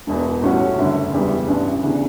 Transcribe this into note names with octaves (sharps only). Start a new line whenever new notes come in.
E1 E2 B2
A2 G3 C#4 F#4
F#1 F#2 D3 G3
E1 E2 C#3 G3
A1 G2 E3 G3 D4
D2 C#3 E3 B3